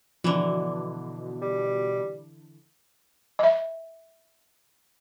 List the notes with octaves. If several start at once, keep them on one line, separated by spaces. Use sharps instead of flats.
B2 D3 E3 F3
G3
D#5 E5